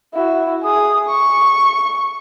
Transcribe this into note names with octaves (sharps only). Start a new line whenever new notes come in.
E4 F#4
G#4 D#6
C#6